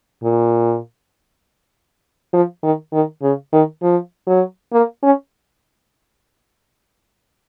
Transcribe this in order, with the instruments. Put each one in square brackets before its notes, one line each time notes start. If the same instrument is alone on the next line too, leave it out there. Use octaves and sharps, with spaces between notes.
[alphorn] A#2
F3
D#3
D#3
C#3
D#3
F3
F#3
A#3
C#4